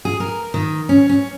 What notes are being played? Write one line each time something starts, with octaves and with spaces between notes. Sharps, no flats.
G#4
A#4
D#3
C#4
C#4